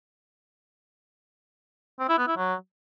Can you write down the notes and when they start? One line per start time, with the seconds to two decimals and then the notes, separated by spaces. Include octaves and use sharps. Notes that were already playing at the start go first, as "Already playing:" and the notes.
1.99 C4
2.09 E4
2.18 B3
2.27 E4
2.37 F#3